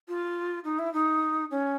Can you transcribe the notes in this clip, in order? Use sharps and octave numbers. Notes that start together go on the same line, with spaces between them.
F4
D#4
E4
D#4
C#4